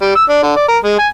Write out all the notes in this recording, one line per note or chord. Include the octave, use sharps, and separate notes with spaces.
G3
E6
D4
D3
D5
A#4
G#3
G#5